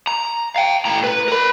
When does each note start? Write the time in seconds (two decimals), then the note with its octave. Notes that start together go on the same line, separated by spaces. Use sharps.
0.07 A#5
0.56 F5 G5
0.85 A2 A#5
1.04 B4
1.28 A#4 B5